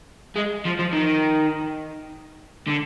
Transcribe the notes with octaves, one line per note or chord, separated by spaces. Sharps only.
G#3
F3
F3
D#3
D3